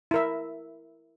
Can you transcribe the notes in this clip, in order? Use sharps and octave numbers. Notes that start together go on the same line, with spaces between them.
E4 A#4 E5